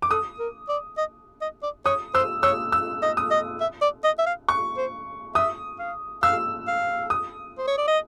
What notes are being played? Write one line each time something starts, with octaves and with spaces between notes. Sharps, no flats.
D6
A4 D#6
A#4
D5
D#5
D#5
D5
C#5 D#6
C5 E6
C#5 E6
E6
D#5
D#6
D#5
E5
D5
D#5
E5
F5
C#6
C5
E5 D#6
F5
F5 E6
F5
D#6
C5
C#5
D5
D#5